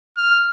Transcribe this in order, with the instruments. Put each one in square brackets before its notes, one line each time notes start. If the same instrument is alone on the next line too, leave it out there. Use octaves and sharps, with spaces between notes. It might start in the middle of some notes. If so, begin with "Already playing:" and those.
[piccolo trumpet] F6